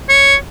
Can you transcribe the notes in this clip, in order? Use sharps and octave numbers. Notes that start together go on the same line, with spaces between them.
C#5